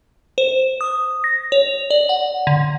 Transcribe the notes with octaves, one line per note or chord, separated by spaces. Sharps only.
C5
D#6
A#6
C#5
D5
F#5
D3